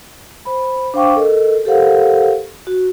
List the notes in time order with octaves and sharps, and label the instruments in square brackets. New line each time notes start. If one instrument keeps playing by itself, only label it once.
[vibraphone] C5 B5
D4 C5 F5 G5 C#6 D6
A4 A#4 D#5
G4 A4 A#4 C5 F5 F#5
F#4